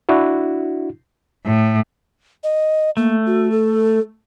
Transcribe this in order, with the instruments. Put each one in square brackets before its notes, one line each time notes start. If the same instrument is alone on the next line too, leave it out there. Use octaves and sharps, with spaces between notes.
[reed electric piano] D4 E4 F#4
[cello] A2
[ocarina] D#5
[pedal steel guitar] A3 [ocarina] A#3
[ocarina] F#4
A4